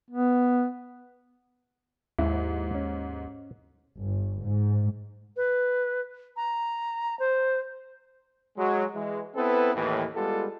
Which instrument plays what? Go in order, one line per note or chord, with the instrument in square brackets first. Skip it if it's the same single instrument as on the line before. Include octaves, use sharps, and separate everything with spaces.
[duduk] B3
[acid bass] D#2 [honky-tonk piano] G#2 [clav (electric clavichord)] E4
[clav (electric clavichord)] C#4
[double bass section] G1
G#2
[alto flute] B4
A#5
C5
[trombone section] F#3 G#3
E3 G#3
B3 C4 E4 A4 B4
D#2 A2 E3
G3 G#3 B3 F4 G4 A4